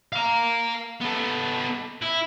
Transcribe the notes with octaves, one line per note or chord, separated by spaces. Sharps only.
F5 A#5
B3 A4
E4